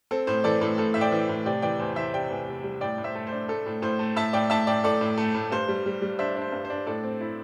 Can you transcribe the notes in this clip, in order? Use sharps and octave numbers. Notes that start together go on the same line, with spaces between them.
C4 A4
A2 C5
E3 A4 D5
A2 A4
A2 A4
A2 E5
D5 G5
E3
A2
C3 D5 G5
E3 D5 G5
E2 C5
E3 C5 E5
C3 D5 G5
E2
C3
G3
A2 D5 G5
A2
C5 E5
A3
C5
D4
A3 A4
A2
A2 C5
A3
A2 E5 A5
A2 D5 G5
A2 E5 A5
A2 D5 G5
A2 A4 D5
A2
A3
A2
G2 C5
G3
G3
G3
D4 C5 E5
D4 C5
G2
C5
D4
A2 A4 D5
C4
E4